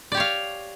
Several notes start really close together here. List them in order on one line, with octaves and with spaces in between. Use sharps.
D5 G4 C#5 F5